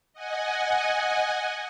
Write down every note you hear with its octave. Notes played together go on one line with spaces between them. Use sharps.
D#5 F#5 G#5